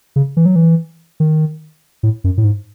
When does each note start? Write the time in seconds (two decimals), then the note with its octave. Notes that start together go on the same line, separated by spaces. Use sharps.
0.16 C#3
0.37 E3
0.46 F#3
0.56 E3
1.20 D#3
2.03 A2
2.24 F#2
2.37 A2
2.44 G#2